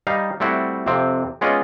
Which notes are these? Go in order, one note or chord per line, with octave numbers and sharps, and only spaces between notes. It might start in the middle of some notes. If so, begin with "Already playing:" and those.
G3 D#4 F5
G3 A3 C4 E4 F#4
F2 C3 C4
G#3 B3 C#4 F4 D5 D#5